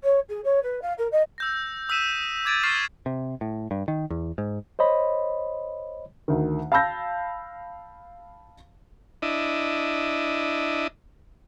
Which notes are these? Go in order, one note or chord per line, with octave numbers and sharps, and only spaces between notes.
C#5
G#4
C#5
B4
F5
A#4
D#5
E6 G6 A#6
D#6 E6 F#6 B6 D#7 E7
D6 G#6 A6 D7 D#7
C#6 E6 F6 A6 C7 E7
C3
A2
G2
D#3
E2
G#2
C5 C#5 D#5 B5
D2 D#3
F5 A5 B5 E6 G6 A#6
D4 E4 D#5